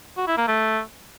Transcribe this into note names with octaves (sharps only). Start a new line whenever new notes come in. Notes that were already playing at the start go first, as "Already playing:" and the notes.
F#4
E4
A#3
A3